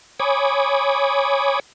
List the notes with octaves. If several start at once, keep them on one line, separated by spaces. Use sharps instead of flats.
C#5 G#5 B5 D6 D#6